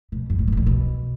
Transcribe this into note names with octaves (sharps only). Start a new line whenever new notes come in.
B2
F#2
A#2
B2
G#2
A#2
B2